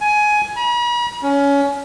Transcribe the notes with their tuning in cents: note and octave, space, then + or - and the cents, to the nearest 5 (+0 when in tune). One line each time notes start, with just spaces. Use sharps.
G#5 +15
B5 -45
C#4 +20